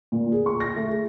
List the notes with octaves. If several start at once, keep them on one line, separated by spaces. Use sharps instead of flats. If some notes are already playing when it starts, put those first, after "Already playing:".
A#2
G#4
C#6
A#6
A3
G#4